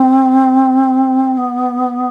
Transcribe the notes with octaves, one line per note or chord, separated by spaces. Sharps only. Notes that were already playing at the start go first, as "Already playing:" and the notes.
Already playing: C4
B3